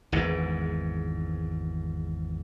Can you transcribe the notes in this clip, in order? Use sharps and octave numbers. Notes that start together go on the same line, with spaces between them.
G#1 E2 G#2